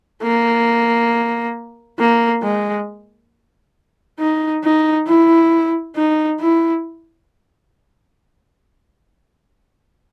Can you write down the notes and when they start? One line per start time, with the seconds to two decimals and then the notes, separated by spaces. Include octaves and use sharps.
0.23 A#3
1.99 A#3
2.43 G#3
4.19 D#4
4.64 D#4
5.07 E4
5.96 D#4
6.40 E4